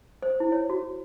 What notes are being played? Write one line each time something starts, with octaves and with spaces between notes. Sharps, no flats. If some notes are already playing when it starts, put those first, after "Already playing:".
C5
E4
C#5
F#4